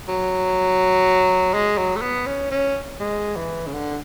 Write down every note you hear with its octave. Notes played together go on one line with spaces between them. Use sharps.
F#3
G#3
F#3
A3
B3
C#4
C#4
G#3
E3
C#3
D3